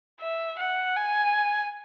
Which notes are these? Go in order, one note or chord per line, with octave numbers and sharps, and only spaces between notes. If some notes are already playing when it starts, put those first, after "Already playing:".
E5
F#5
G#5